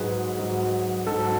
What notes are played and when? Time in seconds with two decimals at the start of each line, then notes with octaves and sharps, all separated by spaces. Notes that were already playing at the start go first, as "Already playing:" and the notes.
Already playing: G#2 F#3 G#4 B4
0.38 G#2 F#3
1.07 G#2 F#3 A4